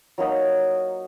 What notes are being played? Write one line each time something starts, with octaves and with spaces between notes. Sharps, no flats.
F#3 A#3 D#4 F#4